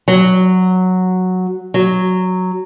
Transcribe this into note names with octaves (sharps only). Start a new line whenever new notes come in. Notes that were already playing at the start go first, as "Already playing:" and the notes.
F#3
F#3